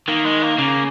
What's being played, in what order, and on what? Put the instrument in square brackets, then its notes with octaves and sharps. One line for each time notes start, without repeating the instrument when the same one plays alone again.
[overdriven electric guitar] D#3 [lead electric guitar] A#3
[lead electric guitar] G#3
A#3
[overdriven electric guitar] C#3 [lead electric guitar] A#3